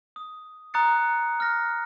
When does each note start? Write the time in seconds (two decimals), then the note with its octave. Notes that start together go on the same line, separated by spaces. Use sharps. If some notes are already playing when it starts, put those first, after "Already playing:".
0.16 D#6
0.74 A#5 D#6 F#6 A6 C#7
1.40 F6 A#6